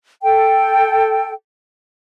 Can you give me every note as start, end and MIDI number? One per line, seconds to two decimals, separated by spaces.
0.23 1.32 69
0.23 1.32 79